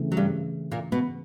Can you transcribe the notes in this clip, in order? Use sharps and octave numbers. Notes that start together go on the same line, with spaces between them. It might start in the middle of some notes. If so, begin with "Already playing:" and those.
Already playing: C#3 E3 A3 C4
F#3
G2 G3
A#2 A#3
B2 B3